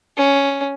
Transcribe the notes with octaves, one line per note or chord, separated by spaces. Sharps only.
C#4